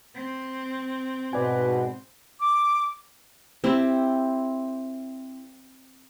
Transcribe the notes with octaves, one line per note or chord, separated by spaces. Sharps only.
C4
G#2 B2 F#4 B4 D5 G#5
D6
C4 E4 G4